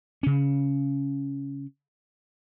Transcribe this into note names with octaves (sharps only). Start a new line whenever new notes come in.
C#3 C#4